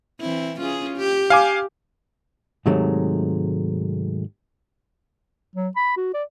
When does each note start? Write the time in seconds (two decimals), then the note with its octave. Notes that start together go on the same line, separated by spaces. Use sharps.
0.21 E3 C4 E4
0.60 C#4 F4 G#4
0.97 G4
1.30 F5 G#5 D6
2.66 G#2 C3 D#3 F#3 G#3 A3
5.56 F#3
5.76 B5
5.97 F#4
6.14 D5